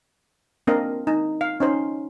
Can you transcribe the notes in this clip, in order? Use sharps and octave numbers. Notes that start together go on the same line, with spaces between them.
A#3 C4 D4 A#4 D#5 F5
D#4
F5
C#4 D#4 C5